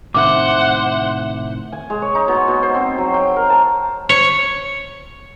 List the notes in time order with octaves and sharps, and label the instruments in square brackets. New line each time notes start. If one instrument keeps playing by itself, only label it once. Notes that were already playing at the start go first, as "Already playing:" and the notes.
[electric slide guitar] A2 C3 D#3 [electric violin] C5 F#5 [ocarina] E5 [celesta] D6
[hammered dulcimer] G#5
G#3
C#5
D#4
B2
B2
C5
C4
F#3
G5
A#4
A5
[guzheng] C#5